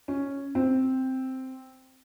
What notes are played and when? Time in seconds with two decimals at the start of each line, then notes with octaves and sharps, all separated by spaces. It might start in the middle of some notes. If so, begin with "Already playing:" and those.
0.08 C#4
0.55 C4